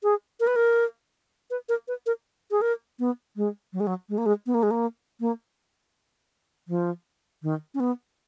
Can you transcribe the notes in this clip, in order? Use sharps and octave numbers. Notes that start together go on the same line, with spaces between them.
G#4
A#4
B4
A#4
B4
A#4
B4
A#4
G#4
A#4
B3
G#3
F#3
G#3
F#3
G#3
A#3
G#3
B3
A#3
G#3
A#3
A#3
F3
D#3
C#4
B3